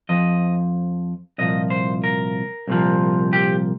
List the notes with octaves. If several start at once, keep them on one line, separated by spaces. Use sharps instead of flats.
F2 F3 D#5
C2 A#2 F3 D#5
C5
A#4
C2 A#2 F3
G4